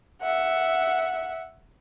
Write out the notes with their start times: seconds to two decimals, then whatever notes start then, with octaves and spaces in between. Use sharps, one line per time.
0.22 E5 F#5